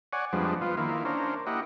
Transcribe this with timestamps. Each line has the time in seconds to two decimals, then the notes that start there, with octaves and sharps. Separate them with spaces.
0.13 C#5 D5 F#5 G#5
0.33 F2 F3 G3 G#3 B3 D4
0.61 F3 B3 F4
0.77 D#3 A#3 E4 F4
1.05 C#4 D4 A#4 C5
1.47 A#3 E4 G4 D#5 F#5